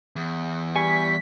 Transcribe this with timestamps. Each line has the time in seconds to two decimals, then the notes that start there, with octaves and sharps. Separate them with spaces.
0.16 E2
0.76 G3 G#5 C#6 B6